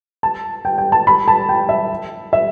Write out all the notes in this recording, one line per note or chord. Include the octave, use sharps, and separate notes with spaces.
A5
G5
G5
A5
B5
A5
G5
E5
E5